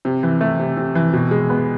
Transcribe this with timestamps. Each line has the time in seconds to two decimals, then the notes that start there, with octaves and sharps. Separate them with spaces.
0.05 C3
0.23 E3
0.41 A3
0.59 C3
0.77 C3
0.95 E3
1.13 B2
1.31 G#3
1.50 B3